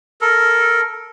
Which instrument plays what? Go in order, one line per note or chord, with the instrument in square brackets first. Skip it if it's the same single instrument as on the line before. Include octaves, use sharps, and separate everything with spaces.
[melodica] A4 A#4